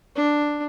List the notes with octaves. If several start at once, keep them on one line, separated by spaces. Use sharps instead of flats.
D4